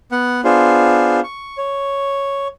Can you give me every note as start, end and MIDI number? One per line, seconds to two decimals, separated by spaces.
0.12 0.41 59
0.12 0.41 78
0.44 1.20 59
0.44 1.20 62
0.44 1.20 65
0.44 1.20 68
0.44 1.20 72
1.24 1.57 85
1.58 2.48 73